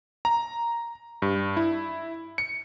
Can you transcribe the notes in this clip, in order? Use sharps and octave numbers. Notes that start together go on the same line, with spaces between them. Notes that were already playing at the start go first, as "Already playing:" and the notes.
A#5
G2
E4
C#7